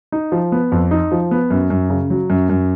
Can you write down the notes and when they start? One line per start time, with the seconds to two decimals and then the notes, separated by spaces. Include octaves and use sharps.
0.12 D#4
0.32 F3
0.52 B3
0.72 F2
0.91 D#4
1.12 F3
1.31 B3
1.50 F#2
1.70 F#2
1.90 C#3
2.10 F#3
2.30 F#2
2.49 F#2